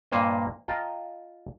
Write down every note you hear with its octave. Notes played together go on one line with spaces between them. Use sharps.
G2 A#2 A#3 C5 D#5
F4 D#5 G5 A5 A#5